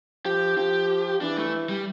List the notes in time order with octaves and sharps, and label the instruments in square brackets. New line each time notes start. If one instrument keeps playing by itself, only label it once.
[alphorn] F3 [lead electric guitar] G4
[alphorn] F3 [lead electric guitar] G4
[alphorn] E3 [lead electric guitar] D4
[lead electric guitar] A3
G3